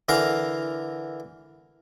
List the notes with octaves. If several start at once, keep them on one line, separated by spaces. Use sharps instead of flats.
D3 E3 A#4 F5 A#5